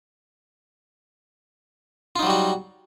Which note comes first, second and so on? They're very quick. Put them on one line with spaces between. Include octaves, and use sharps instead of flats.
F4 D#4 F#3 G3 F#4